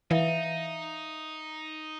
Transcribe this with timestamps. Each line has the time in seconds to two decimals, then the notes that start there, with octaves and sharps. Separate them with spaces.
0.11 E3 D#4 E5 F5